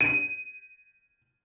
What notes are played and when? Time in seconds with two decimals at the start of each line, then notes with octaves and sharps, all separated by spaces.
0.01 D#7